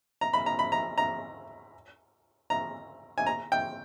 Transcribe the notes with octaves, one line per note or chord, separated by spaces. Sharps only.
A#5
B5
A#5
B5
A#5
A#5
A#5
G#5
A#5
G5